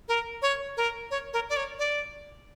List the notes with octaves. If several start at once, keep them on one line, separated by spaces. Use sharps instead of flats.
A#4
C#5
A#4
C#5
A#4
D5
C#5
D5